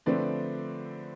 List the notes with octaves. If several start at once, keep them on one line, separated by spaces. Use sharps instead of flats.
D3 F3 A3 C4 B4 D5